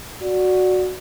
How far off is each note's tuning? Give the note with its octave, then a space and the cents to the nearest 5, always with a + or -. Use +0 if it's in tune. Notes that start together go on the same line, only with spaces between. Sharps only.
F#4 -5 D5 +0